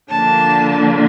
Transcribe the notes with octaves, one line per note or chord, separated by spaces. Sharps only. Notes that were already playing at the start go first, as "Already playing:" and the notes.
D3 F3 A#3 D4 A5